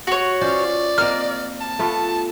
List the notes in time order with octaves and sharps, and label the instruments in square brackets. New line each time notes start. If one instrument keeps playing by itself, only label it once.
[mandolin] F#4 C#5
[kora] C#4 F4 C5 [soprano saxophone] D5
[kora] A#3 C4 D#5 [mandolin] F6
[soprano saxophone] A5
[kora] A3 B3 F4